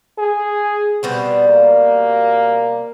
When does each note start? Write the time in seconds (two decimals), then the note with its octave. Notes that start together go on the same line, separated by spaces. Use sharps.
0.19 G#4
1.03 B2 G3 B3 C4
1.49 A#3